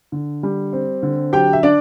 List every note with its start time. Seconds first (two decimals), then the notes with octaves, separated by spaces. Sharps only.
0.12 D3
0.43 G3
0.73 C4
1.03 D3
1.33 F#3 G4 G5
1.53 E5
1.63 D4 D5